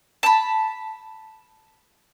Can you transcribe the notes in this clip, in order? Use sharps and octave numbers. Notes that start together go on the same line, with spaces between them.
A5 B5